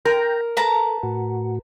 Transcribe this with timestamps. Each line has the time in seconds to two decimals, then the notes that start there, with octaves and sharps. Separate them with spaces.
0.05 A#4 G5 A#5
0.57 A4 B4 A5 A#5
1.03 A2 F#4